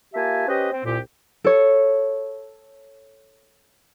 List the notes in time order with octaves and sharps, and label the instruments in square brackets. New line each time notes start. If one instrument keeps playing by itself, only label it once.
[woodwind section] A#3 F4 G4 E5 G#5 A5
C#4 G4 B4 C5 D#5
C4
C2 A#2 G4
[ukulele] A4 C#5